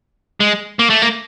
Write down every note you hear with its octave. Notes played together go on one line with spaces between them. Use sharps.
G#3
A#3
A3
A#3